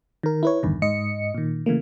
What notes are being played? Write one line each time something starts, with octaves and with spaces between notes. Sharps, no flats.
D#3 A#4
E4 B4 C#5
A1 E2 G2 D3 D#3
G#2 D#5 C#7
A#2 D#3
C#3 E3 A3 A#3